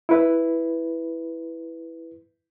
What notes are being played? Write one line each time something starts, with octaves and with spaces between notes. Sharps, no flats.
E4 B4